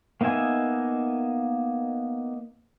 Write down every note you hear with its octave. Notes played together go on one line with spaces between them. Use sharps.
A#3 B3 D#4 E5 G#5